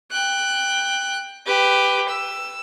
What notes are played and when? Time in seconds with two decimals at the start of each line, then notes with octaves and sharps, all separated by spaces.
0.11 G5 F#6
1.46 G4 B4
2.09 E6